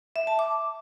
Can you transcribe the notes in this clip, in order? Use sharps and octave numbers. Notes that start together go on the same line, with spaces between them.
E5
A5
D6